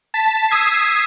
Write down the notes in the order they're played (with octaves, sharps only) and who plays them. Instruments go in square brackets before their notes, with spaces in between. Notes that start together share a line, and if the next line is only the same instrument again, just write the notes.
[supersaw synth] A5 B6
D#6 E6 G#6 B6 C7